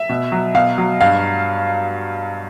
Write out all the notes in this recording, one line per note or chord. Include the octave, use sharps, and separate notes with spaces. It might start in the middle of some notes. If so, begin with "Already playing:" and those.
Already playing: E5
B2
F#3
B2 F5
F#3
G2 F5